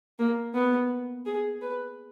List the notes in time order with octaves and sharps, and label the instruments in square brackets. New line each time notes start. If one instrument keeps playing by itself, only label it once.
[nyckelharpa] A#3
B3
G#4
B4